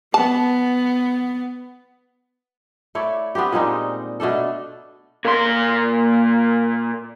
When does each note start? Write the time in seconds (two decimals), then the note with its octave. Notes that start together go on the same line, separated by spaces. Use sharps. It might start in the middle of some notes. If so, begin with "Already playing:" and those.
0.14 B3 A5
2.95 A3 E4 C#5 D5
3.35 B3 C4 D4 G4
3.53 A#2 G3 G#3 D#4
4.20 B2 A3 D4 A4
5.25 A#2 A#3 C6